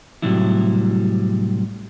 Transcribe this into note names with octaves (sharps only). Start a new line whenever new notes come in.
A2 C3 F#3 G3 E4